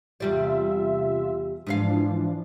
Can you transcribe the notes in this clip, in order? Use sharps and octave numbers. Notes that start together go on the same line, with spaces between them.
E2 C3 G3 F4 D5 E5
G#2 E3 F3 D4 B4 F5